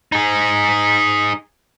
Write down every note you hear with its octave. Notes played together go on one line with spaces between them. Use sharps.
D#4 G#4